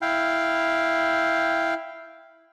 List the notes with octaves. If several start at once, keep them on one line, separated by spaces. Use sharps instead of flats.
E4 F5 G5